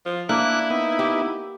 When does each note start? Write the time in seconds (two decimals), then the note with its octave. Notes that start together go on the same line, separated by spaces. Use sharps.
0.06 F3
0.29 A#3 D4 E4 F#6
0.70 B3 D#4
0.99 G4